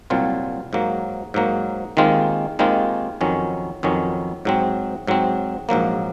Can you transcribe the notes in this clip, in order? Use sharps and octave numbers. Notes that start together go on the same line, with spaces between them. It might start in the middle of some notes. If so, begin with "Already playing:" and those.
C2 A#2 F#3 C4 F4
G#2 F#3 A#3
G#2 F#3 A#3
D#2 D#3 G#3 C4 F4
D#2 D#3 G#3 C4 F4
F2 D#3 F#3 C#4
F2 D#3 F#3 C#4
G#2 F#3 C4
G#2 F#3 C4
A#1 G#2 F#3 A#3